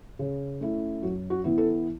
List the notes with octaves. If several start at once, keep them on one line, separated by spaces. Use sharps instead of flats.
C#3
A3 C#4 E4
F#2 F#4
F#4
E3 B3 E4
A4